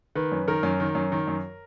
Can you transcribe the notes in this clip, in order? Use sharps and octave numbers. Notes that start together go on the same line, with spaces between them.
D#3 B4
F#2
D#3 A#4
F#2
D#3
F#2
D#3
F#2